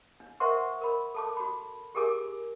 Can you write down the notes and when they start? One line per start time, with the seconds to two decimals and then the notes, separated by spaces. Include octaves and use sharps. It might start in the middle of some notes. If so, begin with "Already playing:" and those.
0.20 D4
0.40 A#4 C5 E5 F#5 C6 C#6
0.81 A#4 B5
1.14 A4 A5 D6
1.37 F#4 B5
1.95 G4 G#4 A#4 G#5 D6